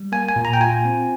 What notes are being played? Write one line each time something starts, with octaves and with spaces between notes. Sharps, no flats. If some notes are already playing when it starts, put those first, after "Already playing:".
Already playing: G3
A#3 G#5
G#5
A#2
A#5
G5
F4 G#5
C4